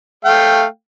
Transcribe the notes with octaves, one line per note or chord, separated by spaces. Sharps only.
A3 F5 G5